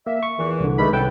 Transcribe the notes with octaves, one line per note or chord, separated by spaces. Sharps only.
A#3 E5
C#6
E2 A#2 E3
C2 D3
G2 D#3 G#3 A3 B5
C2 B3 C#4 A4 B4 G5